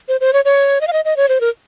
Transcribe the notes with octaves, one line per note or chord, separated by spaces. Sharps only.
C5
C5
C#5
C#5
D#5
F5
D#5
D#5
C#5
C5
A#4